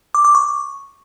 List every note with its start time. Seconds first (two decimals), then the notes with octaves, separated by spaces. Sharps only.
0.15 D6
0.25 D6
0.35 C#6